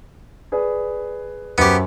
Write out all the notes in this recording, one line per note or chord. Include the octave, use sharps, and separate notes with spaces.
G#4 B4 D5
F#2 B3 G4 C5